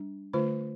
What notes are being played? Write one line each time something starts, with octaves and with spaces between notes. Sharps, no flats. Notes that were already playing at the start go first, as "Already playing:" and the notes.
Already playing: G3 D4
D3 A3 F4 C5